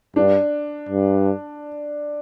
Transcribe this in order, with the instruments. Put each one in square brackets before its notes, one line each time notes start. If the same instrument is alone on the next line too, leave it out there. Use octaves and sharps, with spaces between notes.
[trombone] G2 [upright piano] D4
[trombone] G2